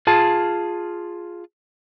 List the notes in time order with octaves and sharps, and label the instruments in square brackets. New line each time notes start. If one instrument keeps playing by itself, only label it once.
[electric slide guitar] F4 G#4 A5